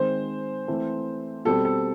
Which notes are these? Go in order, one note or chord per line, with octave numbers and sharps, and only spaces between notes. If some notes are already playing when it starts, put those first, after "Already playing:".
Already playing: D#3 G#3 C4 C5
E3 A3 C4
B2 G3 C4 A4
A4